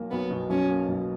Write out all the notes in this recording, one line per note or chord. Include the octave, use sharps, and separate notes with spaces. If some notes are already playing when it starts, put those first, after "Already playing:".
Already playing: B1 A#3
B1 B3
B2
B1 C#4
A#3
B1